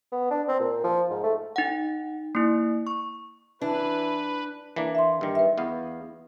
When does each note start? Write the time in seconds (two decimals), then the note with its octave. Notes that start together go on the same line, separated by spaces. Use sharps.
0.12 B3
0.30 D4
0.48 C4
0.60 A#2
0.84 F3
1.11 G#2
1.23 A3
1.56 D#4 F#5
2.35 A#3 E4
2.87 C#6
3.61 E3 D4 B4
4.76 E3 A#3 D4
4.95 E5 C6
5.21 G2 D#3
5.35 B4 E5
5.58 E2 B3 F5